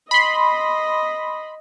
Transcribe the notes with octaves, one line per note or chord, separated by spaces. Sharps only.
D#5 B5 C6